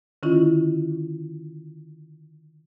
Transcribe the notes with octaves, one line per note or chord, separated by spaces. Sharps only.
D3 D#3 C#4 E4 F4